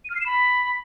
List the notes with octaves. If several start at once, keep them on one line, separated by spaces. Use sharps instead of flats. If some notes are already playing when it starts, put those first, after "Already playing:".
D#7
F6
C7
E7
B5